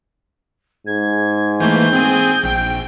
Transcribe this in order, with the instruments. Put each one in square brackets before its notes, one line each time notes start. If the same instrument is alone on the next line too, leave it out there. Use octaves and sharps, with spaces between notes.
[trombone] G#2 [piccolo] G#6
[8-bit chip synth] E3 A3 A#3 [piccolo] G6
[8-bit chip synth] C4 G#4 G#5
A#1 G5